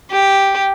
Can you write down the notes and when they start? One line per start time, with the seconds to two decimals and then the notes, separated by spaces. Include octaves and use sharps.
0.11 G4